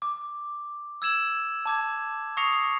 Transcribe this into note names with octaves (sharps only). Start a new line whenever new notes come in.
D6
E6 G#6 E7 F#7
A5 D6 G#6
C#6 D#6 A#6 C7 C#7 F7